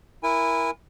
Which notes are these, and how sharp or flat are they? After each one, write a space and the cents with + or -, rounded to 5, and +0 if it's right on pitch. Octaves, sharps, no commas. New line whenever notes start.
E4 +5 A#4 +15 G#5 -25